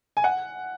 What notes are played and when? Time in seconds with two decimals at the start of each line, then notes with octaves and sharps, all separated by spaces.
0.17 G#5
0.24 F#5